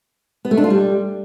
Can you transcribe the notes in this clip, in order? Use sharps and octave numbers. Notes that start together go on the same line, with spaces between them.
B3
A3
D4
F4
G3